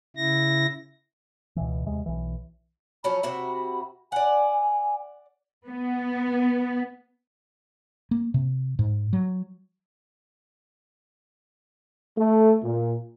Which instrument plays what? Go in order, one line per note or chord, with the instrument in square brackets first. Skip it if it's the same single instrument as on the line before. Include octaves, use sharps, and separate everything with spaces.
[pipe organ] C#3 E4 A#6
[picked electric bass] C#2 B2 E3
D#2 C3 G#3
B1 E3
[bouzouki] F3 F#3 C#4 [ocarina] B5
[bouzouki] C3 F#4 E5
[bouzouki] D5 F#5 [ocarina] G#5
[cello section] B3
[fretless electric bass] A#3
C3
G#2
F#3
[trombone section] A3
A#2